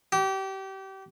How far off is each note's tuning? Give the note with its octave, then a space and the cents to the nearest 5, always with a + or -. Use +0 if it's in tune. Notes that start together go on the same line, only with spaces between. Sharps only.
G4 -30